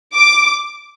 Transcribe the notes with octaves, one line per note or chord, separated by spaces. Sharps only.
D6